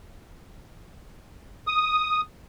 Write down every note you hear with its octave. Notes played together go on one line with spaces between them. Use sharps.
D#6